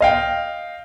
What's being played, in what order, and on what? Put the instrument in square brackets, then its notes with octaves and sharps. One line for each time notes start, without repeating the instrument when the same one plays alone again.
[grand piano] D#5 F5 G5